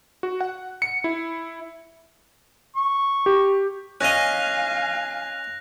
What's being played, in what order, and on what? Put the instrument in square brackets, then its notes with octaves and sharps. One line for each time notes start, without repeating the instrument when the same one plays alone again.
[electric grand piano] F#4
F#5
C#7
E4
[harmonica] C#6
[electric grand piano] G4
[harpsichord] C#4 D#5 [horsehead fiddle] F5 G#5 [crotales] F#6 A#6 F7